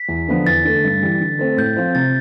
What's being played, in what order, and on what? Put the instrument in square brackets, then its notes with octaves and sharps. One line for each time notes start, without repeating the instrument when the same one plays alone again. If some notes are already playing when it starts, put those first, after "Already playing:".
Already playing: [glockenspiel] B6
[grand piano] E2
D3 F3 B3 D4
[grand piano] E2 [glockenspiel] A6
[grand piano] D3 A3
G2
E3 G3
D3
A3 C4
[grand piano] A2 [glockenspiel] G6
[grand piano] F3 C4 F4
[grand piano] C3 [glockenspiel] A6